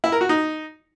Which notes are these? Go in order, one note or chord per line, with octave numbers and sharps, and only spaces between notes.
E4
A#4
F#4
D#4